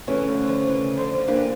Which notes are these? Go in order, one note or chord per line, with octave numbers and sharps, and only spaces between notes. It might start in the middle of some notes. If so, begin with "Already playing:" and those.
C#3 E3 A3 C#4
D3 F3
E3
D3 F3
C#3 E3
D3 F3
F3
E3 G3 A#3 D4